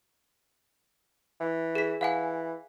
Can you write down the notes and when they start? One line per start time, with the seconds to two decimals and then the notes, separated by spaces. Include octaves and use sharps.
1.40 E3
1.75 G#4 B6
2.01 E3 F5 F#5 G#5